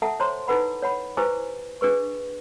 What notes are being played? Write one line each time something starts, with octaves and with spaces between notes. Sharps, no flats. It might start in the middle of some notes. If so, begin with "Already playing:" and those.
A4 E5 F#5 A5 A#5
C5 C#5 A#5 C6
D#4 E4 A4 B4 F#5 B5
C#5 F#5 B5
E4 G4 B4 C5 G#5 D6
D4 G#4 B4 C#6